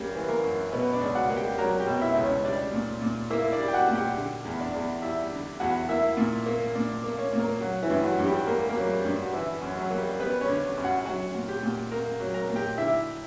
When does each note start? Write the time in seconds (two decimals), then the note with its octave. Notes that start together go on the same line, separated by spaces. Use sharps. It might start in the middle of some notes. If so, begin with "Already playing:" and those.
Already playing: F#2 G3 A#3 G4
0.15 E3
0.29 A#3 A#4
0.44 F#2
0.72 B2 B3 B4
0.93 D4 D5
1.01 C#2
1.15 F#4 F#5
1.29 A#3
1.36 G4 G5
1.58 F#3 A#4 A#5
1.80 G4 G5
1.87 B2
2.01 E4 E5
2.15 C#2
2.22 C#4 C#5
2.44 G3 D4 D5
2.73 A#2
3.02 A#2
3.30 A#3 E4 E5
3.52 D4 D5
3.59 G3
3.68 G5
3.73 F#4 F#5
3.89 A#2
3.95 G4 G5
4.17 D3
4.45 E2
4.60 D4 D5
4.74 E2
5.02 G3 E4 E5
5.32 D3
5.60 E2 F#4 F#5
5.89 A#3 E4 E5
6.17 A#2
6.46 A#3
6.75 A#2 D4 D5
7.04 A#3
7.18 C#4 C#5
7.33 A#2
7.39 A#3 A#4
7.61 F#3 F#4
7.83 E3 E4
7.90 G2
8.04 F#3 F#4
8.19 G2
8.26 G3 G4
8.47 A#3 A#4
8.69 A#3 A#4
8.76 F#3
8.91 G3 G4
9.05 G2
9.22 F#4
9.33 D3 E3 E4
9.61 F#2
9.77 F#3 F#4
9.91 A#3
9.98 G3 G4
10.19 G3 B3 B4
10.41 C#4 C#5
10.48 D3
10.77 F#2
10.84 F#4 F#5
11.05 F#3 F#4 F#5
11.35 A#2
11.48 G4 G5
11.63 A#2
11.91 A#3 A#4 A#5
12.20 F#3
12.34 A#4 A#5
12.49 A#2
12.56 G4 G5
12.77 D3 E4 E5